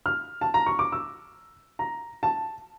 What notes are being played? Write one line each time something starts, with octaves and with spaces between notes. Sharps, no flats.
F6
A5
A#5
C#6
D6
E6
A#5
A5